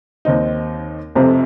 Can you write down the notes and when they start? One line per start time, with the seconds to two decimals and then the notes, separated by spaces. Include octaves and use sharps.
0.25 D#2 D#3 C4 D#4
1.15 F1 F2 C3 F3